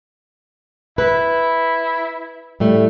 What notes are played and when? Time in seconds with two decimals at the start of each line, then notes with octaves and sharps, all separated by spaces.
0.98 E4 B4
2.60 A2 G3 A3